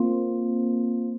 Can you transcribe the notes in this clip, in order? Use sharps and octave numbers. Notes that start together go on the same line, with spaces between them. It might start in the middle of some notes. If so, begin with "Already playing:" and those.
Already playing: A#3 C4 F4 C5 F5 C6